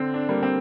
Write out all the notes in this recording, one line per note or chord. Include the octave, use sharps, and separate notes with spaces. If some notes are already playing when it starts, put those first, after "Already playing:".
Already playing: D3 C4
D4
G3 A#3
C4